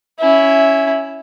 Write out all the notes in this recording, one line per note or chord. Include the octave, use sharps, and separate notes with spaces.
C#4 E4